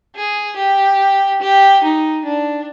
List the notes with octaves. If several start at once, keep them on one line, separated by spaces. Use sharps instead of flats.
G#4
G4
G4
D#4
D4